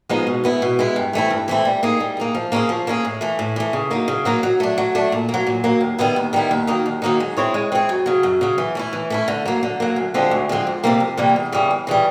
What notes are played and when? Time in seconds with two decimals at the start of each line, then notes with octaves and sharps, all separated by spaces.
0.09 F3 G#3 B3 D#4
0.27 B2
0.44 G#3 B3 E4
0.62 B2
0.79 G#3 B3 E4
0.96 G2
1.13 E3 A3 C4 E4
1.31 G2
1.48 E3 A3 C4 E4
1.65 G3
1.83 A#3 D#4 G#4
2.00 G3
2.17 A#3 D#4 G#4
2.35 F3
2.52 A#3 C#4 E4 G#4
2.69 F3
2.87 A#3 C#4 E4 G#4
3.05 A2
3.21 E3 A3
3.39 A2
3.56 E3 A3
3.73 C#3
3.91 F#3 A#3 D#4
4.08 C#3
4.25 F#3 A#3 D#4
4.43 F#3
4.60 A3 D4
4.78 F#3
4.95 A3 D4
5.12 A#2
5.29 A#3
5.34 F#3
5.47 A#2
5.64 F#3 A#3
5.81 D#2
5.99 D#3 G3 B3 E4
6.16 D#2
6.33 D#3 G3 B3 E4
6.51 D#2
6.67 D#3 F#3 A#3 D#4
6.86 D#2
7.02 D#3 F#3 A#3 D#4
7.20 G#3
7.37 C4 E4 G#4 C#5
7.54 G#3
7.72 C4 E4 G#4 C#5
7.89 F#2
8.06 C#3 F#3
8.23 F#2
8.41 C#3 F#3
8.58 E3
8.75 A3 C#4 E4
8.93 E3
9.10 A3 C#4 E4
9.28 D3
9.45 F#3 A#3
9.63 D3
9.80 F#3 A#3
9.96 D2
10.14 D3 F3 G#3 C4
10.31 D2
10.49 D3 F3 G#3 C4
10.67 F2
10.84 C3 E3 G3 A#3
11.00 F2
11.17 C3 E3 G3 A#3
11.36 E2
11.52 C#3 E3 G3
11.71 E2
11.87 C#3 E3 G3